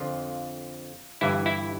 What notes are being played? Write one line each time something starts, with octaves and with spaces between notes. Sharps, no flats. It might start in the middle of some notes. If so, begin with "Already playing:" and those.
Already playing: F2 D3 F3 F4
G1 G2 E3 E4
E4